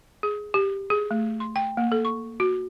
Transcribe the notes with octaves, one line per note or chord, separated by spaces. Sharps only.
G#4
G4
G#4
A3
C6
G5
A#3
A4
C#6
F#4